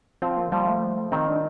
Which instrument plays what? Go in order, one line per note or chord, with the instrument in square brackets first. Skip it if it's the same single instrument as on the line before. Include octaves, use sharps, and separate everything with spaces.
[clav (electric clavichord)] F3 F4 [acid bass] C4
[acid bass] A#3
[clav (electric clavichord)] F3 F4 [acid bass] G3
[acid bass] A3
[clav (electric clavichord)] D#3 D#4 [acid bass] C4
[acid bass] D4